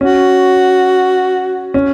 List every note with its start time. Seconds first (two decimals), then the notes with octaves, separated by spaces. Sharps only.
0.01 C#4 F#4
1.74 C#4